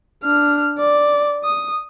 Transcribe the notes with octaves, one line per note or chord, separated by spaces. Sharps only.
D4 F6
D5
D#6